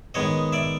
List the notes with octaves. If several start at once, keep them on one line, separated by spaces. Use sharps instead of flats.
D#3 G#3 B3 C#5 D#5
D5 E5